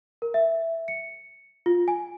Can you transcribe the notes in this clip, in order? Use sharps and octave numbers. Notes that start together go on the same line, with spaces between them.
A#4
E5
C#7
F4
G#5